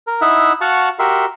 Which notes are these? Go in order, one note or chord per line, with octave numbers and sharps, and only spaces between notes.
A#4
D#4 E4 E5 F#5
F#4 F5 F#5 A5 C#6
F#4 G4 A#4 E5 C6